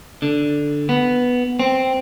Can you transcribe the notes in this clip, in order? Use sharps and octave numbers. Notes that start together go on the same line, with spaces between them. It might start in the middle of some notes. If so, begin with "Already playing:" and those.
D3
B3
C4